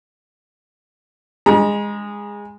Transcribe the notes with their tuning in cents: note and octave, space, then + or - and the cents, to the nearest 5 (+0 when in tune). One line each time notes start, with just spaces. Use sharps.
G#3 -15 A#5 +40